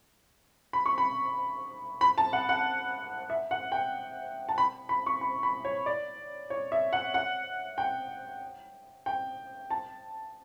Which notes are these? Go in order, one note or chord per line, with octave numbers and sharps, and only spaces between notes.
B5
C#6
B5
B5
A5
F#5
F#5
E5
F#5
G5
A5
B5
B5
C#6
B5
B5
C#5
D5
C#5
E5
F#5
F#5
G5
G5
A5